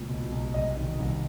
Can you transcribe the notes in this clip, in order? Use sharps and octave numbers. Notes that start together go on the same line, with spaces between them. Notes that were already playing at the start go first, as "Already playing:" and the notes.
Already playing: C#2 A#2
B1
B1
C2 D#5
D#3
C2